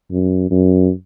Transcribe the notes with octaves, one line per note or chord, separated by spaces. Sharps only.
F#2
F#2